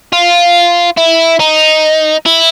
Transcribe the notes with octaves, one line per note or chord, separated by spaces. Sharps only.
F4
E4
D#4
E4